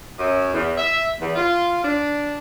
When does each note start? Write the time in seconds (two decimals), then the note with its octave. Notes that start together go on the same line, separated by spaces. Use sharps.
0.19 F#2
0.54 E2
0.78 E5
1.20 E2
1.36 F4
1.85 D4